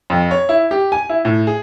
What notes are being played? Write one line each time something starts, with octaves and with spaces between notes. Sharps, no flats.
F2
C#5
E4
G4
G#5
E4
A2
G#4